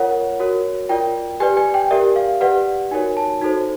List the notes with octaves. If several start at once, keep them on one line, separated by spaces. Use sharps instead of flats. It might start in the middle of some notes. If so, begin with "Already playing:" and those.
Already playing: F4 A#4 C#5 F#5
F#4 A#4 C#5
F4 A#4 D5 G5
G4 B4 D5 G#5
G#5
G5
G4 A#4 D5 E5
F5
G4 B4 D5 F#5
D#4 F#4 A#4 C#5 G#5
A5
D#4 F#4 A4 C5